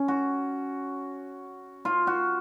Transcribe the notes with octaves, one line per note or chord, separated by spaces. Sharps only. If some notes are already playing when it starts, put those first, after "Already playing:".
Already playing: C#4
F#4
F4
F#4